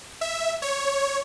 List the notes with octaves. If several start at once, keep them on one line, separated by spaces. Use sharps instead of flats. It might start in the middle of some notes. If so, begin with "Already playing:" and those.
E5
C#5